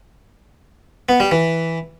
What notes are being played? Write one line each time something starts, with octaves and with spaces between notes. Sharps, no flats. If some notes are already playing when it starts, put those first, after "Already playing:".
B3
G3
E3